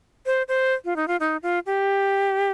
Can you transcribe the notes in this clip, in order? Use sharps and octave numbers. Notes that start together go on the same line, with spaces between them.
C5
C5
F4
D#4
F4
D#4
F4
G4